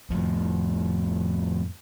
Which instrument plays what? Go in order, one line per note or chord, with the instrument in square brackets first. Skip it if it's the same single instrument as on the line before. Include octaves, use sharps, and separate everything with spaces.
[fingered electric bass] F2 A2